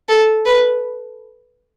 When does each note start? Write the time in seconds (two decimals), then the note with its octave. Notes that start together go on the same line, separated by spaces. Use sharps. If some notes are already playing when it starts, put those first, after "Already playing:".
0.09 A4
0.46 B4